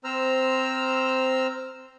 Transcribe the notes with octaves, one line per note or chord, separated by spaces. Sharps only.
C4 C5 A#5 E6 F6